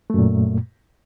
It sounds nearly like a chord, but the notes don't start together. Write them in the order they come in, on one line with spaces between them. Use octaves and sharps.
A3 F#2 A#2